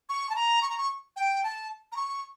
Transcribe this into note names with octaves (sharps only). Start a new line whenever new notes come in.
C#6
A5
A#5
C#6
A#5
C#6
G5
A5
A#5
C#6